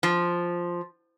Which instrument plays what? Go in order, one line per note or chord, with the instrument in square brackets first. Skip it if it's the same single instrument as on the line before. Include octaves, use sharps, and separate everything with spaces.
[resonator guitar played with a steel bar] F3